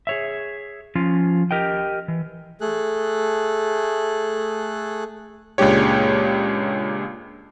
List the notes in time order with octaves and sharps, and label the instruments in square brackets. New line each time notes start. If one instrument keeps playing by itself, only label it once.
[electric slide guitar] G#4 C#5 E5
F3 C#4 F4
G4 A#4 D#5 G5
E3
[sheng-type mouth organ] A3 G#4 A4 F#6
[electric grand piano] C#2 A#2 G#3 D4 G4 C#5